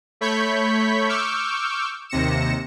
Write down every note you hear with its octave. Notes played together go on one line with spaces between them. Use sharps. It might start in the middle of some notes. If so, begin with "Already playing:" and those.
A3 C#5 B5 C#6 G6 B6
C#6 D6 E6 F6 G6
D#2 C3 A#6 C#7 E7